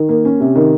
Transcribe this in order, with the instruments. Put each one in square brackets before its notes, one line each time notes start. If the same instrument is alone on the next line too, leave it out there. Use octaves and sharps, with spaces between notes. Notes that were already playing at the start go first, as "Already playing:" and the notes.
Already playing: [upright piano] D#3
A#3
C#4
C3
D#3